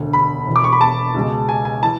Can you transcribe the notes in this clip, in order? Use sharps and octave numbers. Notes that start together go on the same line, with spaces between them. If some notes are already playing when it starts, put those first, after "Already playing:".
Already playing: E1 D2 D3
B5
E1 E2 B2
D6
C#6
B5
A5
C#2 B2 G#3
G#5
G#5
E3 A5